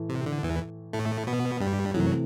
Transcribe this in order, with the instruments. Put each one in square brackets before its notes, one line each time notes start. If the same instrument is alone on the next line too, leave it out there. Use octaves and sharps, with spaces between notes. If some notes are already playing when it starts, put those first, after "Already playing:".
Already playing: [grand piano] A2 E3 A3
[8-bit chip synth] C3
D3
E2 E3
A2 A3
B2 B3
G2 G3
[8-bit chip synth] F#2 F#3 [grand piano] C3 E3 A3